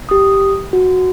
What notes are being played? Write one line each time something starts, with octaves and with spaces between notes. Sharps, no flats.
G4 D#6
F#4